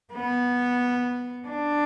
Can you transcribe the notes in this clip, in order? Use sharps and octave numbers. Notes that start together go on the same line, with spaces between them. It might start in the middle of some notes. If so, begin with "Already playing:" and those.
B3
D4